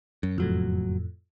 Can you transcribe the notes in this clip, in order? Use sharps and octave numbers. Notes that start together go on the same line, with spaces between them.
F#2
F#1 F2 A2 F#3